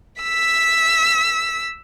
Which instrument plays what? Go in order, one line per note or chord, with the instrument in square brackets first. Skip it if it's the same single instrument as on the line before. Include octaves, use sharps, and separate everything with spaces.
[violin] E6 B6